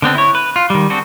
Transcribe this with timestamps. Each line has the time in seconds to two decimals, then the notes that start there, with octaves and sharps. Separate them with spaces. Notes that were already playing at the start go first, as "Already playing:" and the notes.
0.02 D3 B3 C4 D4
0.15 E4 C#5
0.35 B4
0.56 F4
0.70 D#3 G3
0.90 C4 D4 F#4 G#4 C5